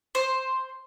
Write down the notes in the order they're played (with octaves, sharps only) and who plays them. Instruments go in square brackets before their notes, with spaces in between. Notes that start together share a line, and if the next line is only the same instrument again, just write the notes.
[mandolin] C5